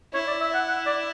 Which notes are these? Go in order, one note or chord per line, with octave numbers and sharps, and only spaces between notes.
E4 C#5
D5
E5
F#5
F#5
D5